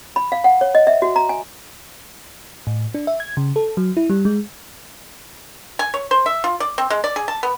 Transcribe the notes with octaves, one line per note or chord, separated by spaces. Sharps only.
B5
F5
F#5
C#5
D#5
E5
F#4
A#5
G#5
A2
D4
E5
G#6
C#3
A4
F#3
E4
G3
G#3
G#5
C#5
C5
E5
F4
D5
C4
G#3
D5
G#4
A5
B3